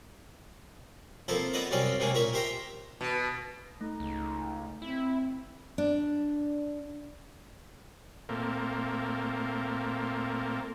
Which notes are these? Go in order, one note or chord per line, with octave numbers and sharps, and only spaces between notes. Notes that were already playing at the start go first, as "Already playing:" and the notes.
F3 A#3 C4 E4 A4
B3 E4 B4 D5 D#5
C2 F#2 C4 C#4 D5 G5
C3 D#3 G#3 A#3 C#4
A#2 A#4 E5 C#6
G4 C5 E5 G5 A#5
B2
A3 D#4
C#2
C4 E4
D4
A#2 A3 A#3 C4